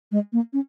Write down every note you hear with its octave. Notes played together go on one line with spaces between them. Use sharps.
G#3
A#3
C#4